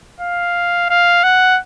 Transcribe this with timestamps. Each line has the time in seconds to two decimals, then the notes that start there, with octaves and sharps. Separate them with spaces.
0.20 F5
0.90 F5
1.23 F#5